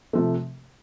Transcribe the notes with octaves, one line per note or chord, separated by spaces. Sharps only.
C3 F3 A3